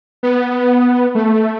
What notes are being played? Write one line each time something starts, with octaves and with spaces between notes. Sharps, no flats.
B3
A3